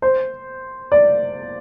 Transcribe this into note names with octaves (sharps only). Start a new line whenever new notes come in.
C5
D5